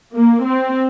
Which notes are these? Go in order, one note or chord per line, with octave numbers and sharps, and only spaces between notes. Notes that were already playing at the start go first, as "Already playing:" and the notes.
A#3
C4